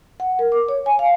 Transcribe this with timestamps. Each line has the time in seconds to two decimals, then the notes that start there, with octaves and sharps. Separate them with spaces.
0.20 F#5
0.39 A#4
0.52 D6
0.69 C#5
0.86 G#5
0.99 F5